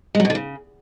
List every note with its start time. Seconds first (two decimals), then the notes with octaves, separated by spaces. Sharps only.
0.15 G#3
0.20 F#3
0.25 B2
0.30 D3
0.35 C#3